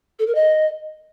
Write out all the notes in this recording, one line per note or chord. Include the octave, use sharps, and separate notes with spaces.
A4
A#4
D#5